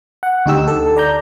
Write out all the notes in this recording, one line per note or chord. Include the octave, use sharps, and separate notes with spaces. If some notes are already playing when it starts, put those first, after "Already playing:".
F#5
D2 D#4 G4 E6
A4
D5 A#5 G6